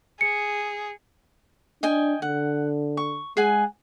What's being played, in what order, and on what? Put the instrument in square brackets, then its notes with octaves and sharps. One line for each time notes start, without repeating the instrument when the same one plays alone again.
[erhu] G#4 [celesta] C#7
[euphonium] D4 [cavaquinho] D#5 G5 G#5
[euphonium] D3 [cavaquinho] F#5
[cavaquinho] C#6
[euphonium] G#3 [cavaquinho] G#4 F#5 G#5